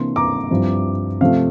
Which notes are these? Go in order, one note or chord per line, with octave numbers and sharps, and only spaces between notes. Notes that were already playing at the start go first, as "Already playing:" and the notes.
Already playing: C3 E3 A#3 D4 C6
A#5 D6
G2 F3 C4 E4
C3 F3 A3 F5